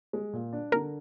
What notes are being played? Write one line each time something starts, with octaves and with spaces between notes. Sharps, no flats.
G#3
A#2
D4
D3 A#4